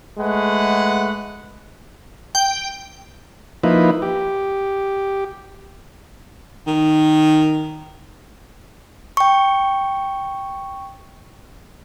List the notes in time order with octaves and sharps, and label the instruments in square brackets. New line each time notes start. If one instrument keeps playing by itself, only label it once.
[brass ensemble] G#3 A3 B4 F#5
[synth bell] G5
[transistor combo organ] F3 A#3 D#4 E4 B4
G4
[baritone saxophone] D#3
[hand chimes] G5 C#6